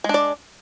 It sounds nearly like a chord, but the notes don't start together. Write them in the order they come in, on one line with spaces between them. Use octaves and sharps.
G#3 D4 D5